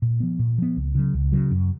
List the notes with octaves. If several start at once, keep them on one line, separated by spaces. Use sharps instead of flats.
A#2
F3 B3
A#2
F3 B3
C#2
C#3 F#3
C#2
C#3 F#3
F#2